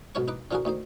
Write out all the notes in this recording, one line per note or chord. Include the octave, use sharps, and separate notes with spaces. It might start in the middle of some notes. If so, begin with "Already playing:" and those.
B1 G#2 B2 F4 C#5 C#6
D#4 B4 D6
D3 F3 F4 F#4 G#4 A#4
D2 D#3 D#4 C5